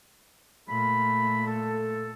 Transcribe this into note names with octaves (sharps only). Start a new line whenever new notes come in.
A#2 A3 B5
A4